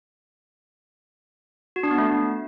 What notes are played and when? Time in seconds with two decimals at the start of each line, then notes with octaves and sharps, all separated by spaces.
1.76 F#4
1.83 D4
1.91 B3
1.98 A3